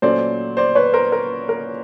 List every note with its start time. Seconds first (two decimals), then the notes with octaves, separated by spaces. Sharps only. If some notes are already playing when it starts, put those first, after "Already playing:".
0.02 A#2 F#3 A3 C#4 C5 D5
0.57 C5 D5
0.75 B4 C#5
0.93 A#4 C5
1.12 A#4
1.49 A#4